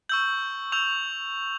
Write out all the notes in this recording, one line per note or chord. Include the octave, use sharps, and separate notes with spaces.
C#6 E6 G6 F#7
C#6 E6 G6 F7